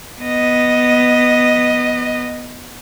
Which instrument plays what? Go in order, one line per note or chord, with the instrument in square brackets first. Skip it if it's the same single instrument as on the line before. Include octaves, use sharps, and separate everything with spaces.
[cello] B3 D#5